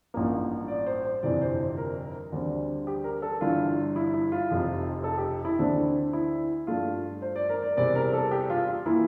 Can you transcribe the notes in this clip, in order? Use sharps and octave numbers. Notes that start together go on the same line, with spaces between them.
A1 G2 F3 A#3
D5
C5
C5
G1 F2 C3 E3 D5
C5
C5
A#4
D2 D3 G3 C4
G4
A#4
A4
G1 G2 E3 G3 F4
E4
E4
F4
F1 F2 C3 F3
A4
G4
E4
D2 D3 A3 C4 D4
E4
G2 F3 A3 F4
C5
D5
A#4
D5
E2 C3 G3 C4 D5
A#4
A4
G4
F4
F4
E3 A#3 E4